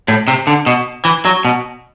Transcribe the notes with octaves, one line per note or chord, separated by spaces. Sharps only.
A2
C3
D3
B2
E3
F#3
B2